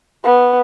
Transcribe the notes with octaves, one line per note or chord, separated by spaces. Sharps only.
B3